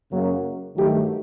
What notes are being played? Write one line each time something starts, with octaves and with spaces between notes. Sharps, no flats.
F#2 C#3 F#3 A#3
G2 D#3 F#3 A3 G4